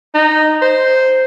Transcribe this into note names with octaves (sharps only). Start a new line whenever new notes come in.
D#4
C5